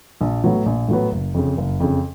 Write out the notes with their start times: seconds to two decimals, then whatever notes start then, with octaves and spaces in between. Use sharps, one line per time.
0.21 A#1
0.43 A2 F#3 B3
0.66 A#1
0.89 A2 F#3 B3
1.12 F#1
1.34 F2 C#3
1.57 F#1
1.80 F2 C#3